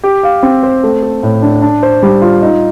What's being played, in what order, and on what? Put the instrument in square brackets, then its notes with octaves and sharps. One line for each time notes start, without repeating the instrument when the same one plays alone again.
[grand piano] G4
F5
C4
C5
A3
A4
A2
D4
D4
C5
G3
F4
D#4